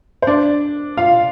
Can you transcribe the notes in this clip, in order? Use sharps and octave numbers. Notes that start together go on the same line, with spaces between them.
C5
D4 D5
F4 F5